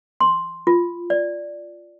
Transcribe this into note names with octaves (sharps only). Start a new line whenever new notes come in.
C6
F4
D5